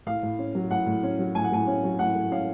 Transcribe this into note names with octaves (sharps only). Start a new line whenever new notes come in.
A2 F5
A2
C#4
F#3
A2 F#5
A2
C#4
F#3
A2 G#5
F#5
A2 G#5
C#4
F#3
A2 F#5
A2
C#4 F5